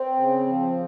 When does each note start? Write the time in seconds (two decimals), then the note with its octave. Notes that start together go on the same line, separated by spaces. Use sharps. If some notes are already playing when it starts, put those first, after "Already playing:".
Already playing: C4
0.16 C#3
0.46 F3